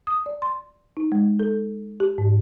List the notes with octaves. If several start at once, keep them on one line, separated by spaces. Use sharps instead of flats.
D#6
D5
C6
D#4
G#3
A4
G4
G#2